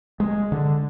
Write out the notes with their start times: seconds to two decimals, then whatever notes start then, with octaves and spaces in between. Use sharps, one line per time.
0.20 G#3
0.52 D3